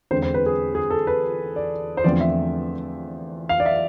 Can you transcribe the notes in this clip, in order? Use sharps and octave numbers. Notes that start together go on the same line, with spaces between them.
E2 D3 G#3 C4 C5
C5
B4
G#4
G#4
A4
B4
D5
C5
E2 D3 F3 A3 C4 D5
E5
F5
D5
E5